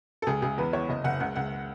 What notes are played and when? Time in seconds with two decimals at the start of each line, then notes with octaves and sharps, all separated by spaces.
0.22 A4
0.27 C#2 G#4
0.42 C#2 G#4
0.58 E2 B4
0.73 E2 C#5
0.89 F#1 D#5
1.04 F#1 F#5
1.20 C#2 F#5
1.36 C#2 F#5